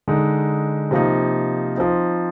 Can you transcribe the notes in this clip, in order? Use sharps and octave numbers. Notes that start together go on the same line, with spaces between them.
D3 G#3 D#4
C3 F3 A#3 D#4
F3 C4 D#4